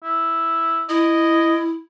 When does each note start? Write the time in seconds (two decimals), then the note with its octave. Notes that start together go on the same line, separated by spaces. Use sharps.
0.03 E4
0.89 E4 D#5